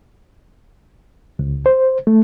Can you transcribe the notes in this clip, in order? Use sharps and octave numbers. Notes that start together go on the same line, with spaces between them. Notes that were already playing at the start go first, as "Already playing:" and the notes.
C#2
C5
A3